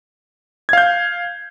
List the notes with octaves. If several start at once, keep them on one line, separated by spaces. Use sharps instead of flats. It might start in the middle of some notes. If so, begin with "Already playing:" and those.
F5 G6 G#6